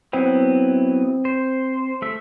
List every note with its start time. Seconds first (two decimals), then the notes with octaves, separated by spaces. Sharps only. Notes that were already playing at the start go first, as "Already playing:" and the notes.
0.13 F#3 B3 C4 E4
1.25 C5
2.02 A3 E5